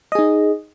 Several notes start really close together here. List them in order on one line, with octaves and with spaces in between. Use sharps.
D#5 G#4 D#4